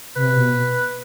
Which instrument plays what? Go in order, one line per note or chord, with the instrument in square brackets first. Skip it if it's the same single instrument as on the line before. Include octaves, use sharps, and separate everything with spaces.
[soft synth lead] C3 [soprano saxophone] B4
[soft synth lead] B2